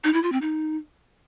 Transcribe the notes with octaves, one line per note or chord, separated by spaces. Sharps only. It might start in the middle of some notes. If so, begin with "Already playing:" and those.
D#4
E4
F4
C4
D#4